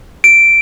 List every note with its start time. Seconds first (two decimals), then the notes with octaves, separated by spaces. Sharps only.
0.24 D7